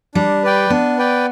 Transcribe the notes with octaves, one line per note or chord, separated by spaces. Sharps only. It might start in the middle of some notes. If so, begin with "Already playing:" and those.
G3 D4
B4 D5 G5
B3 D4
B4 D5 G5